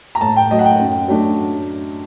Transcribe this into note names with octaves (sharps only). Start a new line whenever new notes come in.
A#5
A2 A5
G5
F#3 A3 D#5
F#5
G5
F#2
F#3 A3 D4